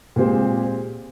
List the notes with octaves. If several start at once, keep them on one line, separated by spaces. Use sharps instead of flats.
A#2 G#3 C4 G4 C5